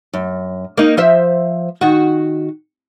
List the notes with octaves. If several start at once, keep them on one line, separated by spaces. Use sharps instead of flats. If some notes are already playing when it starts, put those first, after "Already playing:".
F#2
A#3 D#4
F3 C5 E5
D#3 F#4